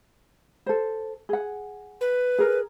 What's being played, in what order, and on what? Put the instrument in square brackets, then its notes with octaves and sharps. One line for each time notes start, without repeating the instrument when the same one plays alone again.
[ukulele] A4 C5
G#4 F#5
[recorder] B4
[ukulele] G#4 A#4